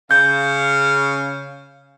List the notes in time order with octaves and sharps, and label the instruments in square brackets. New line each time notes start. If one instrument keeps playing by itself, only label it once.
[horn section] C#3 F5 [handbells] G6